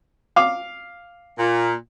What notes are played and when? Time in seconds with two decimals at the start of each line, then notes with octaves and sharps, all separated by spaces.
0.36 F5 D6
1.38 A#2